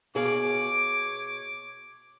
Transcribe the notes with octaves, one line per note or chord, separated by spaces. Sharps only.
B2 G#4 C#5 F5 D6